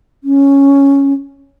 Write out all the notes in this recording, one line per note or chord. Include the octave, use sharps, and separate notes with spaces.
C#4